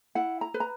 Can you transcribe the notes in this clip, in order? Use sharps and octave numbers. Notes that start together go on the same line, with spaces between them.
E4 F#5
A#5
B4
A#5